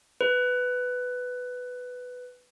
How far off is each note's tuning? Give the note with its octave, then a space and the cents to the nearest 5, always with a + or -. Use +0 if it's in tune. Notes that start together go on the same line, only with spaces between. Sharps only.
B4 +10